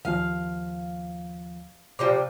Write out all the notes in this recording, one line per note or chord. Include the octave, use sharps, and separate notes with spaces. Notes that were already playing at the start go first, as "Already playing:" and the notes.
D#2 F3 F5
C3 F3 G3 D6